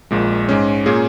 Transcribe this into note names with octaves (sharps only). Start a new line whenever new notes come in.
A#1 A#2 G#3
G#2 G#3 C#4
A#2 A#3 C#4 G#4